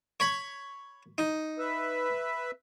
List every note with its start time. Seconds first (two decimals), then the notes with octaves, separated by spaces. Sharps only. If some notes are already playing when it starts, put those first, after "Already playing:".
0.20 C#5 B5
1.18 D#4
1.58 B4 E5